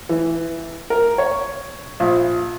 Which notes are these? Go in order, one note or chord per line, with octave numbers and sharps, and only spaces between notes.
E3
A#4
C#5
A#1